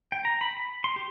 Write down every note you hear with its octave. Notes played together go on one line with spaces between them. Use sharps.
G5
A#5
B5
B5
C6
G4